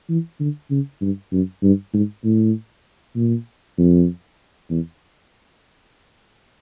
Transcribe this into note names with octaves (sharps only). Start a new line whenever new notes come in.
E3
D3
C#3
G2
F#2
G2
G#2
A2
A#2
F2
E2